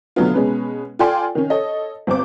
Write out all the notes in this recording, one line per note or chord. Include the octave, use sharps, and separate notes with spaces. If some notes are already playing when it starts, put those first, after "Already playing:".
B2 D3 F#3 A3 B3 F4
B2 G#3 C#4 B4
F4 A4 D5 G5 G#5 C6
D#3 C#4
A4 C#5 D#5
G1 C4 C5 D6